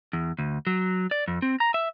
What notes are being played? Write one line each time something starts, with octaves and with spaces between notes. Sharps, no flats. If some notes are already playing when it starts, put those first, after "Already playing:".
E2
D2
F#3
D5
F2
C4
A#5
E5